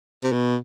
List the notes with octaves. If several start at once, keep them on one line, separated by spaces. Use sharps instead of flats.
C3
B2